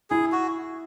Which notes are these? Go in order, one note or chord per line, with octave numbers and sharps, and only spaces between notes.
E4 G#4
F#4